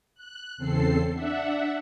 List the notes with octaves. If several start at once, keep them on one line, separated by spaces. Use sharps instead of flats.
F#6
E2 C#3 C4 A4 C7
D4 E5 F#5